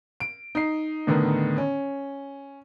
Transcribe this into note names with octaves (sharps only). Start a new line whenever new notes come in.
D7
D#4 C7
A2 D3 D#3 B3 D#4
C#4